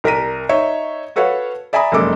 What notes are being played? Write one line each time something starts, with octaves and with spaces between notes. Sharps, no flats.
C2 A#4 A#5 B6 D#7
D#4 C#5 E5
F#4 A4 B4 C#5 F5 F#5
D5 E5 G#5 A#5 B5 D#6
F1 F#2 G#3 A#3 A4 D6